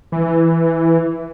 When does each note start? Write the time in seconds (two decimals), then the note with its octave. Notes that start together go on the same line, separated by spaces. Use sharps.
0.12 E3